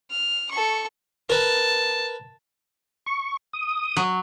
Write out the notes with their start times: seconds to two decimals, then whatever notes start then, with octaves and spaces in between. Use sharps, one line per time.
0.11 F6
0.51 A4 C#6
1.30 A#4 B4 A5
3.06 C#6
3.53 D#6
3.97 F#3